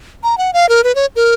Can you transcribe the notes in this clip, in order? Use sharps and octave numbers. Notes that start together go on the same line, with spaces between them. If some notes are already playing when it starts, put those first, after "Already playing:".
A#5
F#5
F5
A#4
B4
C#5
A#4